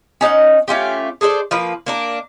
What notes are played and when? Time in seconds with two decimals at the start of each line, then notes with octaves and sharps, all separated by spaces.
0.21 C#4 D#4 F5 F#5
0.68 A3 C#4 F4 G4
1.21 G#4 A4 C5 D5
1.51 F3 A#3 B4
1.86 A#3 D4 A#4